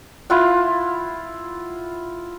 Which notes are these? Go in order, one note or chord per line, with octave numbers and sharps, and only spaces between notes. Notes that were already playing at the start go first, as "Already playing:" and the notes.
E4 F4 F#5